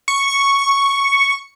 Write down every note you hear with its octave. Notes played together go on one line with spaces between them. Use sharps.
C#6